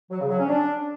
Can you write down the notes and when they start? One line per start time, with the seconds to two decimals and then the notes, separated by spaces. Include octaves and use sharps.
0.11 F#3
0.20 C#3
0.30 F#3
0.39 C#4
0.48 D4